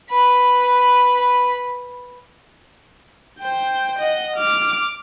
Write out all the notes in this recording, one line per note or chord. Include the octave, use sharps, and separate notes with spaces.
B4 B5
C5 G5
D#5 F#5
D6 F6